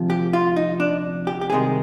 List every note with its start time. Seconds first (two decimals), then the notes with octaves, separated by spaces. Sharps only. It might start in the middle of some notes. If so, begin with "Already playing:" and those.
Already playing: D2 C3 F3
0.10 G4
0.33 F4
0.56 D#4
0.80 D4
1.27 G4
1.41 G4
1.50 C2 C3 D#3 G#3 G#4